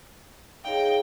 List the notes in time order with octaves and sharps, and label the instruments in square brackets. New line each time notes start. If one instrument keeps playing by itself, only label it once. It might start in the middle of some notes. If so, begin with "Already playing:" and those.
[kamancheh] D#4 G5 [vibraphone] G#4 C#5 F5